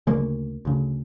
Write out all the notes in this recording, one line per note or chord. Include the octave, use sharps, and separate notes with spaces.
D2 C#3 G#3 A#3
D2 C#3